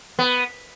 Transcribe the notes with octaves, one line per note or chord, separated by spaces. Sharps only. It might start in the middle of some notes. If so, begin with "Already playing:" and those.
B3